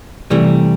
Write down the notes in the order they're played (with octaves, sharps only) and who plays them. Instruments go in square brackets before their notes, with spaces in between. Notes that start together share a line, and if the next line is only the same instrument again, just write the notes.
[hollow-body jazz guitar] C3 E3 G3 A3